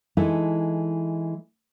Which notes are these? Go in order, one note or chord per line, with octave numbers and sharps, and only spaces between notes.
E3 G#3 D#4 E4 A4